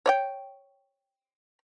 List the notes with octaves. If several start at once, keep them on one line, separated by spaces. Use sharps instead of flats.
C#5 D5 G5